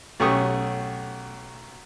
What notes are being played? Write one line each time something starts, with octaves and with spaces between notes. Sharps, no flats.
B1 A3 C#4 G4 C#6 D#6